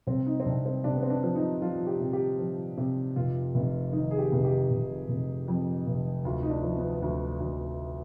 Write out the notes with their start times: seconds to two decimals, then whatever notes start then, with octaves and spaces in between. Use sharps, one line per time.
0.07 C2 C4
0.27 D#4
0.40 C4
0.46 C2 D4
0.66 C4
0.84 C3 D4
0.95 B3
1.03 C4
1.10 D4
1.23 F3
1.35 D#4
1.62 F3 F4
1.87 G4
2.00 C3
2.13 G4
2.39 F3
2.77 C3
3.16 F1 F4
3.55 F1
3.92 D#3 D#4
4.11 G#4
4.19 G4
4.32 F1
4.45 G4
4.71 F1
5.09 F1
5.48 F2
5.86 F1
6.25 D2 F4
6.43 D#4
6.50 D4
6.63 F3
6.76 B3
7.02 D2
7.40 D2